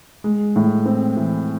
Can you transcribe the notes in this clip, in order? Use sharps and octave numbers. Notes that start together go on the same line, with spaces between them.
G#3
A2
C4
E3